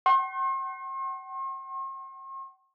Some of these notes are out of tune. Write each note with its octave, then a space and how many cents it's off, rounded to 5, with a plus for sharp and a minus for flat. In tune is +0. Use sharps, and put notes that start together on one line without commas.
F#5 +45 C6 +45